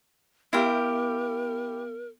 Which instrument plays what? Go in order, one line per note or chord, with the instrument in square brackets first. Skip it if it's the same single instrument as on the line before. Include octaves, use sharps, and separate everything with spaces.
[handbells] B3 F5 F6 [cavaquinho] E4 G4 [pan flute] A#4